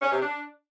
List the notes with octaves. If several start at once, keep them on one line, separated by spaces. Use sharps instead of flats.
C#4
C3
D4